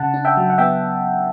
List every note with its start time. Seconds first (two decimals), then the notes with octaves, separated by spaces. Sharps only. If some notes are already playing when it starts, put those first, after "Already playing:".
Already playing: C#3 F#5 A5
0.14 D4
0.25 E5 G5
0.37 F#3
0.50 F#5
0.58 B3 E5 G5